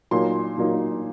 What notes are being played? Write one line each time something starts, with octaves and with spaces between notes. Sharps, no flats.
A#2 F#3 A#3 D#4 C6
A#2 F#3 A#3 D#4